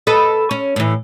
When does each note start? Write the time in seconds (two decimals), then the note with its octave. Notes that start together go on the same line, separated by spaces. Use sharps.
0.07 A4 B4 D#5
0.51 C#4
0.76 A2 E3